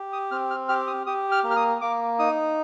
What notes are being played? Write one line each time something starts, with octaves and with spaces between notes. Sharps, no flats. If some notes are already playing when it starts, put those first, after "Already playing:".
Already playing: G4
D#6
C4 F6
F6
G4 F6
D#6
G4 D#6
F6
A#3
F6
D#6
A#3 D6
D#4 D#6